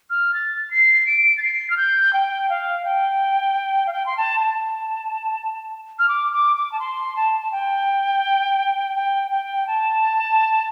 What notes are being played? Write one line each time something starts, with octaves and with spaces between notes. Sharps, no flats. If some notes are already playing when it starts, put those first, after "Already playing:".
F6
A6
C7
D7
A6
C7
F6
G6
G5
F5
G5
F5
G5
C6
A5
A5
F6
D6
D6
D6
A5
C6
A5
A5
G5
G5
G5
A5